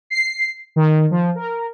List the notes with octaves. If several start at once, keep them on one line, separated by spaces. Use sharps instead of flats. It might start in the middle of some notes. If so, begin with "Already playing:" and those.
C7
D#3
F3
A#4